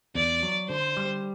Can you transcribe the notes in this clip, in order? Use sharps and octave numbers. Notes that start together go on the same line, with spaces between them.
E2 D5
F#3
D3 C5
G3